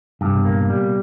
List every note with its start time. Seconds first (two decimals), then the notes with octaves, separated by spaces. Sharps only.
0.21 G2 C3
0.34 B2
0.45 A#2 A#3
0.58 B2
0.70 G3